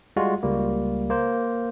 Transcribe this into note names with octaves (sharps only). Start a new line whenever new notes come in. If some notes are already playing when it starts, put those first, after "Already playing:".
G3 G#3 F4 F#4
C#2 G3 A#3
A#3 C5